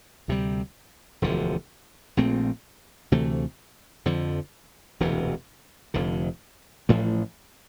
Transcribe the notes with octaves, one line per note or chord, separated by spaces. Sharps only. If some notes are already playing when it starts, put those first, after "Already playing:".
D2 C3 G3
E1 D2 D3 F3
A#1 A#2 A3 C4
D2 C3 E3 A3
F2 D3 F3
E1 D2 C3 E3
F1 F2 D3
A1 A2 F3 A3